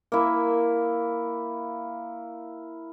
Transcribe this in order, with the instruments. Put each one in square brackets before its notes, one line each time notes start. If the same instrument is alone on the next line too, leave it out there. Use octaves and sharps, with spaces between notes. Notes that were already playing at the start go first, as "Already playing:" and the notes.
[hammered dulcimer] A#3 E4